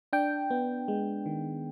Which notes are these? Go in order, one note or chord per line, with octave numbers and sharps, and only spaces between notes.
D4 G5
B3
G#3
D#3